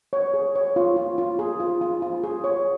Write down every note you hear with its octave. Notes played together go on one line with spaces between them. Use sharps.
C#5
G#4
C#5
F4
F4
F4
G#4
F4
F4
F4
G#4
C#5